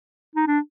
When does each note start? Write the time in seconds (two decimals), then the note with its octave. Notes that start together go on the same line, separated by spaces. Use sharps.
0.35 D#4
0.47 D4